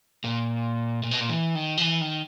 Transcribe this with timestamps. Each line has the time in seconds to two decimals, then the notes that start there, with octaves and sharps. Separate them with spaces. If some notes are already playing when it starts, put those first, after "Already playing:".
0.24 A#2
1.03 A#2
1.11 B2
1.20 A#2
1.29 E3
1.55 D#3
1.77 F3
1.82 E3
2.01 D#3